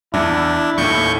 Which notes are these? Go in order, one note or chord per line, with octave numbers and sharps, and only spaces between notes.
E2 D4 E4
D#2 A2 C#6 G6 C#7